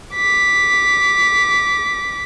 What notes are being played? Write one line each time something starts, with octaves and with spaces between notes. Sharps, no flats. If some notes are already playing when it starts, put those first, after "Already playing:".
D6 B6